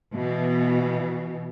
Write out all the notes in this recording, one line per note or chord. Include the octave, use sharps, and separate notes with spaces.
B2 E3